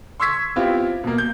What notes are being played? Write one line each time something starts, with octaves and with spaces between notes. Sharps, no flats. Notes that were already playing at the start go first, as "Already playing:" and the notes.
C6 C#6 E6 G#6 B6
B3 C4 E4 F4 G4
B2 A#3
G6